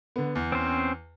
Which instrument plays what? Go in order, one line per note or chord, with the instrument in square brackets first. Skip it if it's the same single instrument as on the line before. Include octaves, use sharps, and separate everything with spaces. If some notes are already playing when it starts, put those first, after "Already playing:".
[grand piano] D3 B3
E2
[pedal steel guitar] C4 C#4 C5